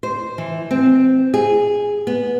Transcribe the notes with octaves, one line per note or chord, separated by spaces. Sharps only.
C5
E3
C4
G#4
B3